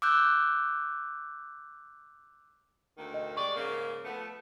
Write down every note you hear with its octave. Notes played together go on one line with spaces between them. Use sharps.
D6 E6 F#6 G6
D2 D#3 A#3
D#5
G3 G#3 D5 C#6
G#2 C#3 A#3
F3 A3 B3